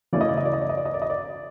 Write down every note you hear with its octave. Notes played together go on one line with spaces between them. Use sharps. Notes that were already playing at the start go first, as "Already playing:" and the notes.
C#3 E3 A3 C#4 D5
D#5
D5
D#5
D5
D#5
D5
D#5
D5
D#5
D5
D#5
D5